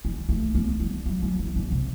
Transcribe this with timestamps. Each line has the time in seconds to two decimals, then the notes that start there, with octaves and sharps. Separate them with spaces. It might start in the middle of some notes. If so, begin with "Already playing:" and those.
0.05 G3
0.29 A3
0.55 B3
0.80 G3
1.06 F#3
1.22 F#3
1.39 E3
1.56 D3
1.72 C3